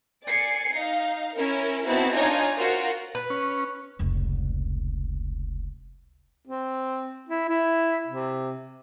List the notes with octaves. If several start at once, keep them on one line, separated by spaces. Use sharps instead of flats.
D5 G#5 C7 C#7
D#4 F5
C#4 E4 A#4
B3 C4 D#4 E4 F#4 A5
D4 D#4 F4 C#5 G#5 A#5
F4 F#4 A#4 C5
B4
C#4
F1 C#2
C4
E4
E4
C3